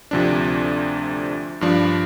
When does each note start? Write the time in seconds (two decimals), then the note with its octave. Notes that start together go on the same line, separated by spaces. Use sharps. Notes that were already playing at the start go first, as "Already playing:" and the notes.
0.11 D2 C3 F3 D4
1.61 G2 F3 D4